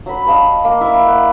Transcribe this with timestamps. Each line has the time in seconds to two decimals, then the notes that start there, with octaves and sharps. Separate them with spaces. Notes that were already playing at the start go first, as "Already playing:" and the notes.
0.06 F#3 B5
0.26 D#5 F5 A5 C#6
0.64 A#3
0.81 E4 E5
1.07 F#5